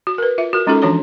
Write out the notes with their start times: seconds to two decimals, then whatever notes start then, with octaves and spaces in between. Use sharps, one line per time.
0.07 F#4
0.18 A#4 B4
0.38 F4 E5
0.53 F#4 A#4
0.67 G#3 C#4 D#4 F4 F#4 A4
0.82 E3 F3 D4 F#4 C#5 A#5